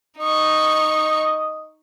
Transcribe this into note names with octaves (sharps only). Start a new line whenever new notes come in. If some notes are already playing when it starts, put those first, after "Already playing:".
D#4 D#5 C#6